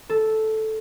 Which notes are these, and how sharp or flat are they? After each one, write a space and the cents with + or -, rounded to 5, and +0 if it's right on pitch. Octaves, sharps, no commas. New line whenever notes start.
A4 -5